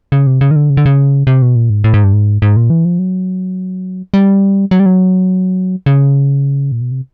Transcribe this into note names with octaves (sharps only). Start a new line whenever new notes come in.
C#3
C3
C#3
D#3
D3
C#3
D3
C#3
C3
B2
A#2
G#2
A2
G#2
G2
G#2
G#2
A#2
E3
F3
F#3
G3
F#3
G3
F#3
C#3
A#2
B2
C3